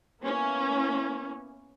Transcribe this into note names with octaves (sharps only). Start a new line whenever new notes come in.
A#3 B3 C#4 E4